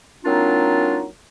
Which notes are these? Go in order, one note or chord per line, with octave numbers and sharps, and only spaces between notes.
F#3 A#3 C4 D4 D#4 F4